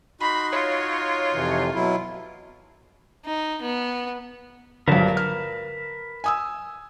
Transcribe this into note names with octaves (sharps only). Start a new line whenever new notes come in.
D#4 F#4 B5 C6
F4 C#5
F2 C3 E3
B2 F#3 E4
D#4
B3
A#1 G2 D3 F#3 A#4 B4 A5
F6
G#5 D#6 E6